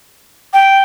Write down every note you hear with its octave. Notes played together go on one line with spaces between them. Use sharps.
G5